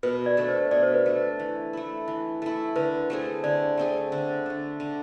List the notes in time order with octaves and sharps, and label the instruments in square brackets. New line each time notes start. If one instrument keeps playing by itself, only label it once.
[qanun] B2 [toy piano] B4
[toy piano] D5
[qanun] A3 D4 A4
[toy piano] C5
[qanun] B2 [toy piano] D5
[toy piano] C5
B4
[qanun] A3 D4 A4 [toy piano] C5
[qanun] E3
A3 E4
E3
A3 E4
[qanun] D3 [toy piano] B4
[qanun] A3 C4 G#4
[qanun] D3 [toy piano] D5
[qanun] A3 C4 G#4
D3
A3 D4
D3